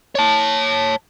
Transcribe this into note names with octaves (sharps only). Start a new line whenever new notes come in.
C#5 A5